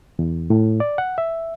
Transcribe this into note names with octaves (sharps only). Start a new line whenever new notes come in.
E2
A2
D5
F#5
E5